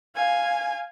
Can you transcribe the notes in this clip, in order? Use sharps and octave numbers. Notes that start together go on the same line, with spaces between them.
F5 G#5